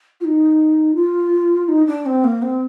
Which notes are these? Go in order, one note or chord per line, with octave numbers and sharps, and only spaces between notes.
F4
D#4
F4
D#4
D4
C4
A#3
C4